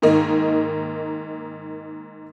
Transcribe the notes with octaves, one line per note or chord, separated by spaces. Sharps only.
G#2 D#3 A#3 D#4